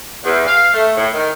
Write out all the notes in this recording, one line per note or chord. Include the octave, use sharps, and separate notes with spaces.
E2
F5
A3
A2
D#3